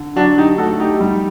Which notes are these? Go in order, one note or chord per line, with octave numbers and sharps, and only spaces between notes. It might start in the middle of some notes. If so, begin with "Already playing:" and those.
Already playing: D3
F#3 D4 F#4
D#4 G4
A3 F#4 A4
D#4 G4
G3